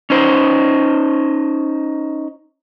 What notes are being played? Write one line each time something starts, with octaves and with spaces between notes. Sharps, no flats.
C#4 D#4 C5